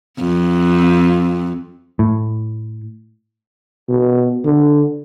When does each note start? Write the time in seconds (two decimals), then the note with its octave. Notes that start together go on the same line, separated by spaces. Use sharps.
0.19 F2
1.99 A2
3.89 B2
4.45 D3